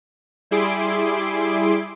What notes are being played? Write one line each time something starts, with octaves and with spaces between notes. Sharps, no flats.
G3 E4 G#4 C6 D6 D7